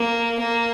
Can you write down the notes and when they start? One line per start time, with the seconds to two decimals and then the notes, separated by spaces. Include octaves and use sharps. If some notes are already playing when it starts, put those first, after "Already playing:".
Already playing: A#3
0.39 A#3